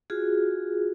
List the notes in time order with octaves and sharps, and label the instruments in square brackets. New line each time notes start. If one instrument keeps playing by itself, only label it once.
[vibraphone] F4 F#4 G#4